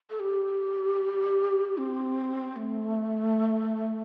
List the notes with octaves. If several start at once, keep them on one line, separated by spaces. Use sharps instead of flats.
A4
G4
C4
A3